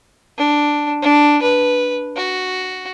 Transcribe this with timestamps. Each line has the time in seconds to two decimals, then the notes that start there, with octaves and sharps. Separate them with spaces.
0.38 D4
1.03 D4
1.42 B4
2.17 F#4